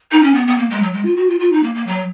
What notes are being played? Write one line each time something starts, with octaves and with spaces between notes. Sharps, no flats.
D#4
C#4
B3
B3
A#3
G#3
F#3
G#3
F4
F#4
F4
F4
D#4
A#3
A#3
F#3